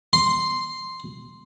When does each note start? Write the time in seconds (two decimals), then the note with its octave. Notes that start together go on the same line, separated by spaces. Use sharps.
0.13 C6